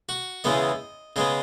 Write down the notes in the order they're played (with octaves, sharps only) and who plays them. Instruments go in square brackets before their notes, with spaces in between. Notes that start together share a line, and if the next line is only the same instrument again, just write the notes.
[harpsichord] F#4
E2 C#3 G#3 B3 D#5
C#3 G#3 B3 D#5